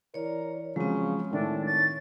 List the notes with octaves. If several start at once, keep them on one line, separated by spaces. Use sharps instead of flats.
E3 A#4 C#5 D5
C#3 F3 F#3 G#3 C4
A2 D#3 A3 D4
C#5 A6